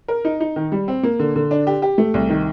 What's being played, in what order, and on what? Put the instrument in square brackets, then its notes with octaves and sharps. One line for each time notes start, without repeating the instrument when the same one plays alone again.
[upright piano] A#4
D#4
D#4
D#3
G3
C4
A#3
D3
D3
D4
G4
G4
A3
C2
D#3